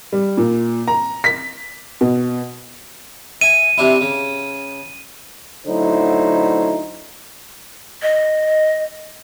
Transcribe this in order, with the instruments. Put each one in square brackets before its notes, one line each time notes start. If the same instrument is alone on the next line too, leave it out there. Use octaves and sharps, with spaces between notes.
[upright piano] G3
A#2
A#5
B6
B2
[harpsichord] E5 G#5 [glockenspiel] D#7
[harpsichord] C3 D4 E4
C#3
[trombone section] D3 F#3 A3 D#4 E4 C5
[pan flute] D#5